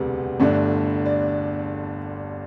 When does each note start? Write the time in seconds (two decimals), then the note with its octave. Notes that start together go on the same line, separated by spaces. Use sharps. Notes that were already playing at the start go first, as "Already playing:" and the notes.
Already playing: E1 D2 C3 G3 B3
0.40 G1 G2 D3 A3 D4
1.06 D5